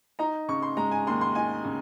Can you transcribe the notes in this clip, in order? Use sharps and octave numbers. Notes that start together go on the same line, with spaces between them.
D#4 A#5
C#3 C#6
C6
G#3 A#5
G#5
D#2 C6
C6
D#4 G#5
C#3